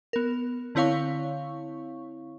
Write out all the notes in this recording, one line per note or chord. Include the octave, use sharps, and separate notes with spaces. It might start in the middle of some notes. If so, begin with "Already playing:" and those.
B3 A#4
D3 C4 E4 C#5 F5 C#6